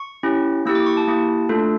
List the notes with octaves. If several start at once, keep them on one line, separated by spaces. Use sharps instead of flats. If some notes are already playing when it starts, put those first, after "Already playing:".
Already playing: C#6
C#4 E4 G4
A#3 E4 G4 E6
D6
C#6
A5
A#3 E4 G4
A3 D4 F4 A4